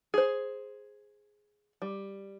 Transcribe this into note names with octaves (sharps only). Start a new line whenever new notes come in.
G#4 C5
G3